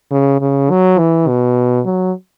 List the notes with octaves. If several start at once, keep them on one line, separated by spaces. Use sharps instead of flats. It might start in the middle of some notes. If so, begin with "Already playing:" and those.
C#3
C#3
F#3
E3
B2
F#3